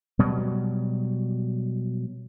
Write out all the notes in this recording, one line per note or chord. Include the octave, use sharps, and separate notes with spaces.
B2 F#3 G3